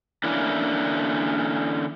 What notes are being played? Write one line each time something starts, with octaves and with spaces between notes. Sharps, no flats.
D3 E3 A#3 C#4 D4 E4